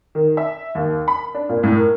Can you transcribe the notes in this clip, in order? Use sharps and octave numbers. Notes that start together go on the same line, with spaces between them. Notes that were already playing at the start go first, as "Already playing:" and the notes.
D#3
E5
D#2
B5
D4
A#2
A2
A#4